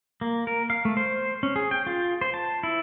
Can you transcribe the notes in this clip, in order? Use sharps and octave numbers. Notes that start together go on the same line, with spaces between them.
A#3
A#4
F5
A3
C5
C#4
G#4
G5
F4
C5
A5
E4